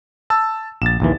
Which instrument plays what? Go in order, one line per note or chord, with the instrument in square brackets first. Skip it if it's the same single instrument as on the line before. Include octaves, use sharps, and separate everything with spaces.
[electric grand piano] A5 E6
[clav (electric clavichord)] A#1 [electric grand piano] A6 E7
[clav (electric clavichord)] A#1 D#2 E3